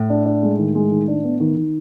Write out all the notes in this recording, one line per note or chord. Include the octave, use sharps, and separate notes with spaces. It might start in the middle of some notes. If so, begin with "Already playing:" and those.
Already playing: A2
D4
D4
G#3
D#3
G#3
D#3
D4
B3
D#3
D#3